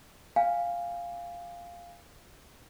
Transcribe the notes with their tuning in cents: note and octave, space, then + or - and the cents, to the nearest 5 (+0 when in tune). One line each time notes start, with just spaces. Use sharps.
F5 +0 G#5 -20